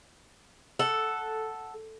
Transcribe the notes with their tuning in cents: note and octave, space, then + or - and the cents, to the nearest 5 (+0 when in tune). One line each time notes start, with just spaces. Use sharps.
A4 +0 F#5 +0